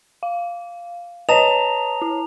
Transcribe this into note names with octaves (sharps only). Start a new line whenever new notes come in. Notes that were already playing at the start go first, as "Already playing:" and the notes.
F5
B4 C#5 D#5 A5 A#5 F7
E4